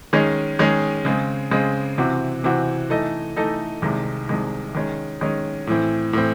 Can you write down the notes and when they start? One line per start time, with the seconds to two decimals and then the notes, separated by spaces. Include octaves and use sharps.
0.13 D#3 G#3 C#4 G#4
0.59 D#3 G#3 C#4 G#4
1.05 C#3 G#3 C4
1.51 C#3 G#3 C4
1.98 C3 E3 C4 F#4
2.44 C3 E3 C4 F#4
2.90 E3 A3 D#4 A4 D#5
3.36 E3 A3 D#4 A4 D#5
3.82 C2 C3 D#3 G#3
4.29 C2 C3 D#3 G#3
4.74 D#3 G#3 C#4
5.21 D#3 G#3 C#4
5.67 A2 E3 C4
6.13 A2 E3 C4